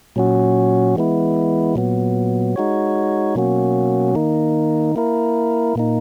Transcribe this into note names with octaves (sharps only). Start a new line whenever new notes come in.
A#2 F#3 C#4 F#4
E3 G#3 B3 E4
A#2 F#3 B3
G#3 D#4 F#4 C#5
B2 F#3 A#3 C#4 F#4
D#3 A#3 D#4
A#3 E4 A#4
A#2 A#3 D#4